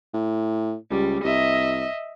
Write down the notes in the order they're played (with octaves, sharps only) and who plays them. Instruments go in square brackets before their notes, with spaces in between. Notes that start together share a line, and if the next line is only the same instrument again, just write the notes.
[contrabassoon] A2
[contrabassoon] C#2 [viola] G3
[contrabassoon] C2 [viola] D#5 E5